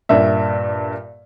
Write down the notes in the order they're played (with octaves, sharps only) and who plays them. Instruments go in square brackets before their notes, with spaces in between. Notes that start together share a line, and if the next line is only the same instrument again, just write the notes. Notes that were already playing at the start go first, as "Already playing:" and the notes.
[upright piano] G2 A#2 E5